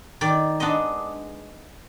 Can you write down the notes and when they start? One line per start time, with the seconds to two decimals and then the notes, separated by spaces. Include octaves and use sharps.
0.21 D#3 D5
0.60 G#3 B3 D4 D#5